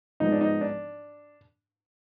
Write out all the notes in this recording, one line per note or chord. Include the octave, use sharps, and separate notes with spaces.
G#2 F3 G#3 B3 D#4
D4
D#4
D4